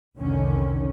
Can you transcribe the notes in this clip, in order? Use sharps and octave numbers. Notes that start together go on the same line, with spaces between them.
F1 C2 D3 D#3 C#4